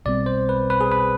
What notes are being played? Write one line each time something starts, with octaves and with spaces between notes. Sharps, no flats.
B1 B2 G3 C4 D5
C5
B4
B4
G#4
B4